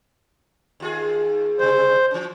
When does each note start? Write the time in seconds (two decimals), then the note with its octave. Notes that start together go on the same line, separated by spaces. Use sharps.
0.80 D#2 F4 G#4
1.59 C3 G3 C5
2.11 E3 C#4